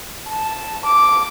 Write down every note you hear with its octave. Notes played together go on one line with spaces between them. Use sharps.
A5
D6